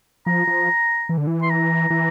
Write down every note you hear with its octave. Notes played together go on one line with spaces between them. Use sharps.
F3 A#5
F3
E3
D3
E3
C6
A#5
E3